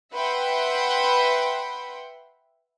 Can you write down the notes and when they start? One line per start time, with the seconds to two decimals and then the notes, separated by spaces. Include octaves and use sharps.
0.13 B4 E5 F#5 G5 B5 C6